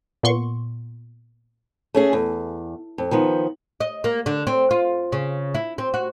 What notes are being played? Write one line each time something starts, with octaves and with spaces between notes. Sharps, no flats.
A#2 B3 C6 C#6
A3 C#4 G#4
E2
F2
D#3 F3 B3
D#5
A#3
D3
C4
F4
C#3
E4
C4
F#4